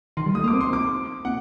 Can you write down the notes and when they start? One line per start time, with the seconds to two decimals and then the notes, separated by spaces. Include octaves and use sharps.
0.17 D#3 C6
0.26 G3
0.35 A3 D#6
0.44 A#3 D6
0.53 C4
0.61 C6
0.73 D6
1.25 A#3 F#5